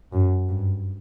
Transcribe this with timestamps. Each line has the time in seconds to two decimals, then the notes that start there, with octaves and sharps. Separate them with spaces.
0.13 F#2
0.49 G2